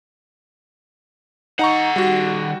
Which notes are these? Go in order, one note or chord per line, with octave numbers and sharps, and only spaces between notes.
D#3 D#4 F#5 A#5 C#6
G3 F#4